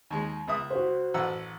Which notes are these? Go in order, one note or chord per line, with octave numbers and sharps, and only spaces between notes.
D#2 G#3
C#2 E5 D#6
F#4 C5
A1 F#5 E6